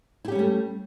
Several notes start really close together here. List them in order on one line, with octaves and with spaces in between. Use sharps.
E4 G4 C#4 G3 A3